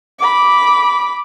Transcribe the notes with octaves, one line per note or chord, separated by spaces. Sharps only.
B5 D6